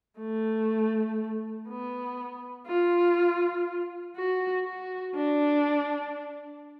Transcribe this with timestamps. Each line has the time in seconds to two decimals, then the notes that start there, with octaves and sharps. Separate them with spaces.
0.20 A3
1.68 B3
2.67 F4
4.16 F#4
4.65 F#4
5.15 D4